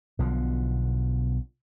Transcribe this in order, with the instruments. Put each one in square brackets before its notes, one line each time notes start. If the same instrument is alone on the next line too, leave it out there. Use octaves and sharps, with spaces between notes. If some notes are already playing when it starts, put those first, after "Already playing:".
[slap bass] B1 B2 D3 F3